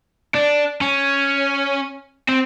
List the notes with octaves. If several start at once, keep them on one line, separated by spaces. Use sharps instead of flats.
D4
C#4
C4